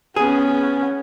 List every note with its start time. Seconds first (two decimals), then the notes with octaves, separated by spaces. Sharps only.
0.16 B3 C#4 G#4